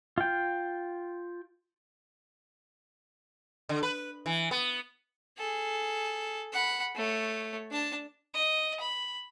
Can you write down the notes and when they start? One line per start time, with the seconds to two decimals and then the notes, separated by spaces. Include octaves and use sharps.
0.18 F4 G5
3.69 D3
3.83 B4
4.26 E3
4.51 B3
5.38 G#4 A4
6.53 F#5 B5
6.95 A3 C#5
7.71 D4 A5
8.34 D#5
8.80 B5